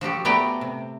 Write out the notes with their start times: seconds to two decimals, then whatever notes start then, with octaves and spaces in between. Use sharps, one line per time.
0.01 F3 F#4 G4 A4
0.25 A3 B3 G4 D5 G5 A#5
0.61 C3